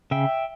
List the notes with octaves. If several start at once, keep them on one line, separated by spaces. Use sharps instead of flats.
C#3 E5 G5